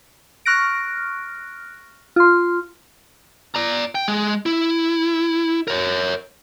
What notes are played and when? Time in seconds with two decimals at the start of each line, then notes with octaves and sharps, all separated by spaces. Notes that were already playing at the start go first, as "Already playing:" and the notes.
0.46 C#6 F6 F#6 A#6 D7
2.16 F4 C6
3.55 D5 A#5
3.95 G5
4.08 G#3
4.46 E4
5.68 A#4 C#5